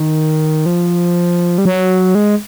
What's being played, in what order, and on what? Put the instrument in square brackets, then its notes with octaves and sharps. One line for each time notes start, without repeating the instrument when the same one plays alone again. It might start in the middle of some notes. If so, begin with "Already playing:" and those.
Already playing: [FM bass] D#3
F3
G3
F#3
G#3